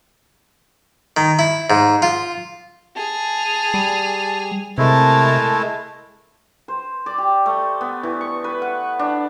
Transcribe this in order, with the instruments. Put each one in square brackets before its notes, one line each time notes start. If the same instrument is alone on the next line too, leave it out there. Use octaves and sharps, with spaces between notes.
[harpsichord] D#3
E4
G#2
F4
[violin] G#4 F7 [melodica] A5
[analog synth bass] G3
[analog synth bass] C3 [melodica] G#3 A3 E4 [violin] A#4 A5
[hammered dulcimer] C5
D5
G4
A3
B3
E3
C#6
B4
F#5
D4